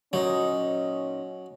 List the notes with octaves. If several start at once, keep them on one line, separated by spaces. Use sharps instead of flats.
A#2 F#3 C#4 D#4 D#5